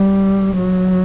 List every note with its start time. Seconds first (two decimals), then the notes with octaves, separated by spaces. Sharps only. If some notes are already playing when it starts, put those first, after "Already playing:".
Already playing: G3
0.57 F#3